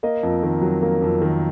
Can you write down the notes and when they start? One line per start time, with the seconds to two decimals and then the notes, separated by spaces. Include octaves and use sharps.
0.03 A#3 D#5
0.23 F2
0.43 D#3
0.62 F#3
0.82 A#3
1.02 F2
1.22 D#3